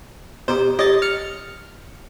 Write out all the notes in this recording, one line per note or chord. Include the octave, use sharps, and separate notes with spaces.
B2 D#4 G4 C5
G4 A4 C#5 D#5 A6
F6 C#7